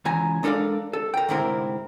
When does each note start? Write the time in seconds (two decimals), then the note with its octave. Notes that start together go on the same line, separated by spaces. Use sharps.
0.05 C#2 E3 G#5 A#5
0.43 G#3 D4 A4 A#4 D5 F5
0.93 A4
1.14 A#4 G5
1.29 D2 G#2 C3 C4 E4 A#4